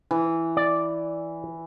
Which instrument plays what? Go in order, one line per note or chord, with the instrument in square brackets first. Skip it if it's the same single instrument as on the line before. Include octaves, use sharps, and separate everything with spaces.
[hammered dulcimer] E3
[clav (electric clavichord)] D5